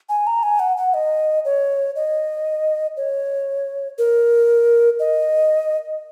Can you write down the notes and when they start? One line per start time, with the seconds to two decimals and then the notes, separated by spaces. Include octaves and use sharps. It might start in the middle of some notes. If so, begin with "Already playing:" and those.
0.09 G#5
0.27 A#5
0.43 G#5
0.59 F#5
0.77 F#5
0.94 D#5
1.45 C#5
1.96 D#5
2.97 C#5
3.98 A#4
4.99 D#5